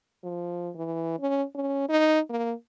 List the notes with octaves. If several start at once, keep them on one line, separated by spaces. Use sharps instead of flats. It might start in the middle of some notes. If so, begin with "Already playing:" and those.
F3
E3
C#4
C#4
D#4
A#3